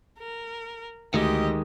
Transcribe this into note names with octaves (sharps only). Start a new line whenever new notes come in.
A#4
D2 D#3 G#3 G4 D#5